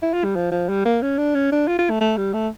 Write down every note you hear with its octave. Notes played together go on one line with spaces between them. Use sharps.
E4
F4
G3
F3
F3
G3
A#3
C#4
D4
C#4
D4
F4
F4
A3
A3
G3
A3